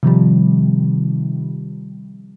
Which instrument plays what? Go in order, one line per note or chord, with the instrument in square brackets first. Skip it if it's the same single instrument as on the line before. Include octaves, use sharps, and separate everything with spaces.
[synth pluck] C3 D#3 F3 G3